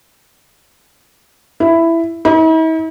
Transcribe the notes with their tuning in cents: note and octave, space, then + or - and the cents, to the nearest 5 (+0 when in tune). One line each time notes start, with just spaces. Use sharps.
E4 +10
E4 -45